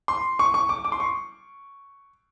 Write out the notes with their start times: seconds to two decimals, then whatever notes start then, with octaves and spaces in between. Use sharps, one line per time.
0.08 C6
0.39 C#6
0.54 C#6
0.69 D6
0.85 D6
0.92 C6
1.00 C#6